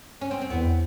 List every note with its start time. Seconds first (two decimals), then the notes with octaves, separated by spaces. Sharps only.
0.21 C#4
0.31 C4
0.41 C4
0.50 E2 B3